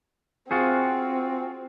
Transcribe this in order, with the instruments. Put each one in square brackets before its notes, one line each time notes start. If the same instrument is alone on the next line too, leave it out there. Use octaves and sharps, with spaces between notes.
[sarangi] C4 [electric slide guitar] F4 F#4 G#4